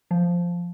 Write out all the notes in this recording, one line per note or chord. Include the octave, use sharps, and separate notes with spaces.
F3